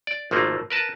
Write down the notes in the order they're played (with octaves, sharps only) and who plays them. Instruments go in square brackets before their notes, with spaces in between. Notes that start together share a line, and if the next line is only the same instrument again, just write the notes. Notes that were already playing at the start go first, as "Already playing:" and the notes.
[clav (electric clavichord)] D5
G#1 F3 A3 A#3
A#4 B4 A5